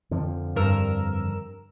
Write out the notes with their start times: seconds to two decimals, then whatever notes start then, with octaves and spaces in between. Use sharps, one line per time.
0.11 F2 D3 F3
0.56 G2 A#4 E6